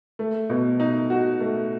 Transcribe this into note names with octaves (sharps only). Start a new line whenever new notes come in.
A3
B2
D#4
F#4
A3